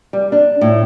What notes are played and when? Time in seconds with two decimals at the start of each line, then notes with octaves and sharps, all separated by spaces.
0.13 G3
0.32 D4
0.61 A2